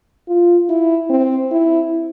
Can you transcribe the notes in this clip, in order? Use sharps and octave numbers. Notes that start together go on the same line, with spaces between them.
F4
E4
C4
E4